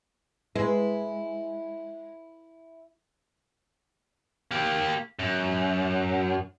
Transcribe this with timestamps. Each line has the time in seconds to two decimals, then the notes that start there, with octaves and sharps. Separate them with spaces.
0.55 G#3 E4 B4
4.51 A#3 G4
5.19 F#2